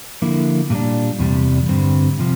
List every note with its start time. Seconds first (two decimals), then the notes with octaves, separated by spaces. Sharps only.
0.22 D3 F3 A#3 E4
0.70 A#2 G3 D4
1.19 E2 C3 G3
1.68 G2 D3 G3 C4
2.19 C3 F3